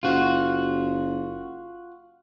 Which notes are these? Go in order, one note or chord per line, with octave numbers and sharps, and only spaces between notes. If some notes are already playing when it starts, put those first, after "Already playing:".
F#1 F4 F#4